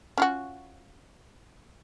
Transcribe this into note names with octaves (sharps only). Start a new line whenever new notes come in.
C#4 F4 F#4